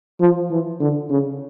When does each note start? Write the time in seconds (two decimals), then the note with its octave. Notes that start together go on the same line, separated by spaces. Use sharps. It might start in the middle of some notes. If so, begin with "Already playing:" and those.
0.21 F3
0.51 E3
0.80 D3
1.10 C#3